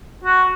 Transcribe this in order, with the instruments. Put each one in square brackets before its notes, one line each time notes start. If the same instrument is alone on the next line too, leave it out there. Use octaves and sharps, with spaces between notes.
[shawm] F#4